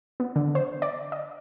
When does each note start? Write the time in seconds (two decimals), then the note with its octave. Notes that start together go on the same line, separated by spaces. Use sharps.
0.20 B3
0.36 D3
0.55 C5
0.82 D5
1.12 D#5